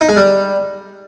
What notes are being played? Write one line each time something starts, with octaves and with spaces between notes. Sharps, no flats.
D#4
G#3
G3